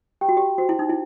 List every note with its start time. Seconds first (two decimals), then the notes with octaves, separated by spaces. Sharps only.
0.21 G4 G5
0.29 F#4
0.37 G4
0.58 F#4 C5
0.69 E4
0.79 D#4
0.90 E4